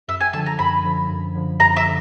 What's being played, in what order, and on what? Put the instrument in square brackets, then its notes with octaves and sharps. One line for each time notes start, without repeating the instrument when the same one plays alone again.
[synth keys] F#2 [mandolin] E5
[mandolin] G#5
[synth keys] D3 F3 [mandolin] A5
[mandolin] A#5
[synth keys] F#2 [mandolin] B5
[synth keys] D3 F3
F#2
D3 F3
[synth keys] F#2 [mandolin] A#5
[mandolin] E5
[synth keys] D3